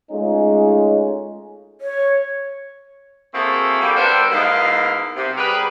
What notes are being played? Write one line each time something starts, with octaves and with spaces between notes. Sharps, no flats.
G#3 A3 C#4 D#4 F4
C#5
A#3 C4 E4 F#4 G#4 A4
G3 A#3
G3 B3 D4 A4 A#4 C5
G#2 B2 A#3 E4 D#5 F5
C3
G3 B3 G#4 A#4 B4